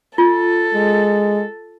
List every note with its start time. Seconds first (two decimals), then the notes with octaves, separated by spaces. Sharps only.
0.18 F4 A4
0.74 G#3